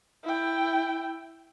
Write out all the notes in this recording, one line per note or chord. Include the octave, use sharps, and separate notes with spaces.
E4 G5